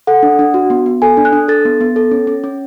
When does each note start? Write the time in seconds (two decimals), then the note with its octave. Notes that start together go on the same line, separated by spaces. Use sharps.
0.07 A4 F#5
0.23 D4
0.39 D4
0.54 F#4
0.70 B3
0.86 B3
1.02 A4 G#5
1.17 D4
1.25 F#6
1.33 D4
1.48 A4 A6
1.65 B3
1.81 B3
1.96 A4
2.11 C#4
2.27 C#4
2.44 C#4